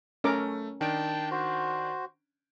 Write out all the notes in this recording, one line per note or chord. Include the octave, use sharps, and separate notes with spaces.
A3 C#4 A#4 D6
D#3 D4 G5 A5 D7
F#4 C5